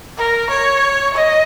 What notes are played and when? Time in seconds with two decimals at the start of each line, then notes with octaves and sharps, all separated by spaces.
0.18 A#4
0.50 C#5
1.14 D#5